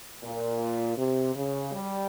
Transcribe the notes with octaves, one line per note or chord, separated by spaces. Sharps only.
A#2
C3
C#3
G3